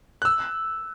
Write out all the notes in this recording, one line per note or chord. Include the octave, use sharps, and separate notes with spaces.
F#6
E6